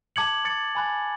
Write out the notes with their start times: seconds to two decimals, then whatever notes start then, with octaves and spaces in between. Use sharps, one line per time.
0.16 A5 D6 G#6 C#7 F#7
0.45 D6 A6 C#7
0.75 G#5 B5 F#6 A6